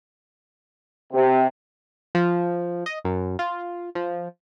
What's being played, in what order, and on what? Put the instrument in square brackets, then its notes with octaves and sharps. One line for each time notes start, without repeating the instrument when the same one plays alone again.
[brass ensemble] C3
[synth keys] F3
D#5
F#2
F4
F3